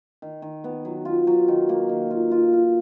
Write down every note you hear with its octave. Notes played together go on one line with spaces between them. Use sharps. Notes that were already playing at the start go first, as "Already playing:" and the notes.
D#3
D#3
B3
F#3
F4
F#3
D#3
A#3
D#3
F4
F4
F4